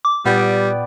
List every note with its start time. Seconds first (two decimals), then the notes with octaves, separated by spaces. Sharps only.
0.05 D6
0.26 A#2 G3 B3 G4 D5